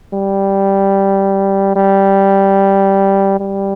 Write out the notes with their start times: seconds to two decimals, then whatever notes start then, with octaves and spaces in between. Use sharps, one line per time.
0.13 G3
1.76 G3
3.40 G3